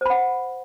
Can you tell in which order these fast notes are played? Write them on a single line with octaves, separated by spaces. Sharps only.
C5 B5 F#5